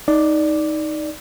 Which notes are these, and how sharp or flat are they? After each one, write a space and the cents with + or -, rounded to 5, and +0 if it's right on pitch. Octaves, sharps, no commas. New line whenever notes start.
D#4 +5 D5 +0